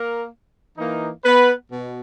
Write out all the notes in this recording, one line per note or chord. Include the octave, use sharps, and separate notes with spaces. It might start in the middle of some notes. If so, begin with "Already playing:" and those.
Already playing: A#3 A#4
E3 A#3 D#4
B3 B4
B2